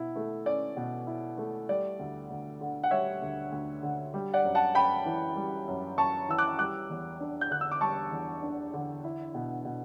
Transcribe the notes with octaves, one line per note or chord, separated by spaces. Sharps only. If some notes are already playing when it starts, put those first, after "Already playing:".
Already playing: B2 E4
A3
C#4 D5
B2
E4
A3
G3 D5
D2
D2
D3
F#5
G3 C#5 E5
D2
D2
D3
G3
D5 F#5
F#2
F#5 A5
F#2 G5 B5
E3
G3
F#2
F#2 A5 C#6
E3 E6
D6 F#6
G3 D6 F#6
E2
D4
G6
D3 F#6
E6
D6
G3 A5 C#6
E2
D4
D3
E4
B2
B2